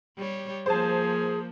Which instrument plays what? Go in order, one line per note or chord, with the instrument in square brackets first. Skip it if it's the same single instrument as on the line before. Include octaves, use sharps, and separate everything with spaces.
[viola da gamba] G3 G4 C#5
[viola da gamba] F3 A#3 [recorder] G#4 [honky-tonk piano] C5 A5